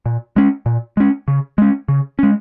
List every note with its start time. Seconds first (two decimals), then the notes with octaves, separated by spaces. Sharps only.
0.06 A#2
0.36 G#3 C#4
0.66 A#2
0.97 G#3 C#4
1.28 C#3
1.58 G#3 C#4
1.89 C#3
2.19 G#3 C#4